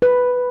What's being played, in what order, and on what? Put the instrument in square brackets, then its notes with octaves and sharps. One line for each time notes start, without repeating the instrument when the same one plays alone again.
[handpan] B4